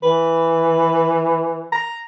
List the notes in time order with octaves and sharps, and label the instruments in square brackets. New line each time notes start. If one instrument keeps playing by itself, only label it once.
[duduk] E3 [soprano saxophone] B4
[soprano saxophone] A#5